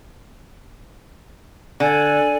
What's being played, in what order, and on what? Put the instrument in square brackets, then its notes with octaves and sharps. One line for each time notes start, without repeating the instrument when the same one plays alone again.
[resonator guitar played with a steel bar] D3 [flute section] A4 D5 G#5